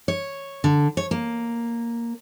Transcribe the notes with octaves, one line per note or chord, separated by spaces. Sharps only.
C#5
D3
C#5
A#3